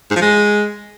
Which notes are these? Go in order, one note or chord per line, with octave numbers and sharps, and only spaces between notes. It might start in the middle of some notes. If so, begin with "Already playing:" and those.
G#2
F3
G#3